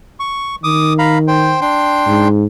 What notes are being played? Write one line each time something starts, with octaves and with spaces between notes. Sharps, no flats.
C#6
D#3 D6 D#6
F5 A#5 B5
C5 G5
D4 G5 C6
G#2